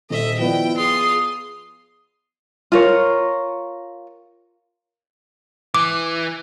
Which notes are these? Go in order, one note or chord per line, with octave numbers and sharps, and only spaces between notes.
D#1 A4 D#5 E5
F3 B3 E4 D5 G5
F4 G#4 C6 D#6
F4 A#4 C#5
E3 D6